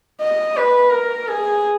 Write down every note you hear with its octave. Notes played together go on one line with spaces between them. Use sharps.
D#5
B4
A#4
G#4